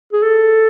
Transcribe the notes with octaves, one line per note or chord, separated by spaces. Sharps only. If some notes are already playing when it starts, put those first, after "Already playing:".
G#4
A4